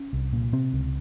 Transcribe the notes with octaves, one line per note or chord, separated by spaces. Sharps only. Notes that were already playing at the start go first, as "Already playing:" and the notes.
Already playing: C#4
C2
A#2
C3 C4
C#2